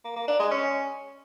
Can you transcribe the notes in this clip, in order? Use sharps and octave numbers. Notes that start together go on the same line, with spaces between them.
A#3
A#3
D4
G#3
C#4